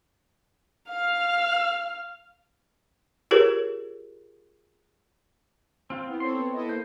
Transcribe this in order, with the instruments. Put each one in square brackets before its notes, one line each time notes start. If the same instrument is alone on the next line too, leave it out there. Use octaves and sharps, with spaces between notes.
[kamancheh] F5 F6
[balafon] F4 G4 G#4 A#4 B4 C#5
[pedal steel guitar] C4 F4
[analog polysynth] B3 [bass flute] E4
[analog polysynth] C4 A4 C#5 [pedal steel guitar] C6
[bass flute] B3
[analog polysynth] E4 A4 D#5
[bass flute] A#3 [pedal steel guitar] C5